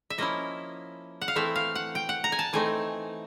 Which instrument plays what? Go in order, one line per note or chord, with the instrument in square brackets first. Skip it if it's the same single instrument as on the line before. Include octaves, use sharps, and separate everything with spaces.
[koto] E5
F3 A#3 C#4 E4 D#5
F#5
F5
E3 A3 C4 E4 E5
F5
F#5
G5
F#5
A#5
G#5
A5
E3 A3 C4 D#4 G#5